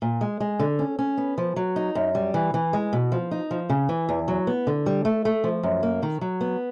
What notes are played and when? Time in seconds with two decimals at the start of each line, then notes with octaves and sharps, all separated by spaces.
0.02 A#2
0.21 G#3
0.40 G#3
0.59 D3
0.79 C#4
0.99 C#4
1.17 B3
1.38 F3
1.56 F#3
1.76 D#4
1.95 F#2
2.15 G3
2.34 E3
2.54 E3
2.73 G#3
2.93 B2
3.12 F3
3.31 D#4
3.51 F3
3.69 C#3
3.89 E3
4.09 E2
4.28 F#3
4.47 B3
4.67 D3
4.86 G3
5.05 A3
5.25 A3
5.44 F3
5.63 F#2
5.83 A#3
6.03 D#3
6.21 F#3
6.41 B3